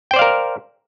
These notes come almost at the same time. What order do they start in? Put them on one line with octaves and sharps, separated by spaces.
G5 C5 D5 F5 A#4